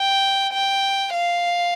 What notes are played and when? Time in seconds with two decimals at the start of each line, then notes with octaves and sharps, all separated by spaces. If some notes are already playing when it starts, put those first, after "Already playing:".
Already playing: G5
0.53 G5
1.14 F5